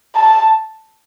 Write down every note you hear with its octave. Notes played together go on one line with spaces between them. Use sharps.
A5